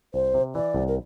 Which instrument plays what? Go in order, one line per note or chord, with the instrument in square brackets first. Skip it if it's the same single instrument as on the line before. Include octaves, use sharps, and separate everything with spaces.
[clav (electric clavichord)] C2 [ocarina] C5
[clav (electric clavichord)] C3
[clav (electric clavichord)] E3 [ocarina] D5
[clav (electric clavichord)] C2
[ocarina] A#4